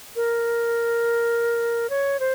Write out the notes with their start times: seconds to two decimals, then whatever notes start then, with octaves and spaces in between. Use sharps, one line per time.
0.16 A#4
1.90 C#5
2.20 C5